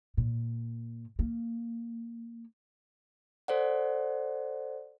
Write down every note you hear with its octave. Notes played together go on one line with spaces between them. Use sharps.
A#2
A#3
A4 C5 D5 F#5